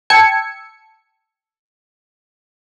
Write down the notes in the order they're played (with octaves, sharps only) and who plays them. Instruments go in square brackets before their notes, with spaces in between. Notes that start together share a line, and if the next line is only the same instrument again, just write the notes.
[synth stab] G5 A5 E6 G#6 C#7